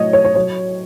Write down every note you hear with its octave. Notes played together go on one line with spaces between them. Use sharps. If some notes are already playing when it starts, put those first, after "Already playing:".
Already playing: A2 F#3 C#5 D#5
C#5
C#5
F#3 C#5